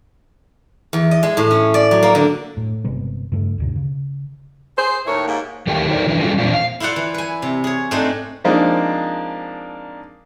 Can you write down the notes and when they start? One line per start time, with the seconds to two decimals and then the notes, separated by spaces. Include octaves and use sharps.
0.93 E2
1.11 D#5
1.23 G#3
1.37 A2
1.51 C#4
1.74 D5
1.91 F#3
2.03 A#3
2.15 D3
2.57 A2
2.84 G1 C3 G#3 B3
3.32 G2 C#3 A3
3.58 D2 G2 C3
3.76 C#3
4.78 G#4 C5
5.07 D#2 A2 E4 A#4 C#5
5.27 G#2 A#3
5.67 D#3 A3 G4 A#4 G5
5.89 D#4 F#4 A4 A#4 C5 D5
6.07 E3 D4 E4
6.21 G3 C#4 F4 F#4 G#4 A4
6.38 A#2 E3 A#3 C4 D4 F4
6.53 F5
6.80 E4 F4 C5 D5 F#5
6.96 E3
7.14 B4 G#5
7.42 C3
7.64 G#4 C#5
7.91 G#2 A3 C4 D4 D#5
8.44 F3 G#3 A#3 C4 D4 D#4